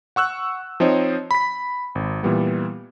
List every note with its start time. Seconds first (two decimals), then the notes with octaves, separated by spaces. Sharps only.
0.16 F#5 C#6 E6 F#6
0.80 F3 C4 D#4 C5 C#5 D#5
1.31 B5 B6
1.95 G#1
2.23 A#2 E3 G3 B3